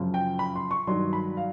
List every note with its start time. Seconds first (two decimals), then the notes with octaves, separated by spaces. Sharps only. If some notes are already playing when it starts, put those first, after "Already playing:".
Already playing: F#2 C#3 F3
0.14 G5
0.39 B5
0.56 C6
0.71 C#6
0.87 G2 D#3 F#3 C6
1.13 B5
1.37 F5